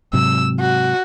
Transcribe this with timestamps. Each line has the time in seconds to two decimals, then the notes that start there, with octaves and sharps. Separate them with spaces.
0.13 G#2 C3 F#3 E6
0.60 F#4